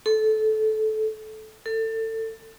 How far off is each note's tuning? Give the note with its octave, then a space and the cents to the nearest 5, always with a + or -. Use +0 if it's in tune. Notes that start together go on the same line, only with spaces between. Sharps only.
A4 -20
A4 +25